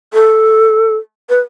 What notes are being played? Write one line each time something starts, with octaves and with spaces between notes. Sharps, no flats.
A4
B4